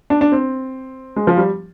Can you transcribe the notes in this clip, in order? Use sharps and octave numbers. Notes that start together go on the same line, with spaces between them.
D4
D4
C4
G#3
F3
G3